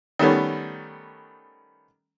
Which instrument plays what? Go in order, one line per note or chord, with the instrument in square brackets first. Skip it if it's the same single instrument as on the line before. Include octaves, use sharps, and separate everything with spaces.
[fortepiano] D#3 G3 A3 B3 C#4